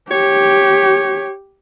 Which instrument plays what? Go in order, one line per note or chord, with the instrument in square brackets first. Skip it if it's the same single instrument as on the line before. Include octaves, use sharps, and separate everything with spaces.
[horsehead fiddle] G4 [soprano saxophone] C#5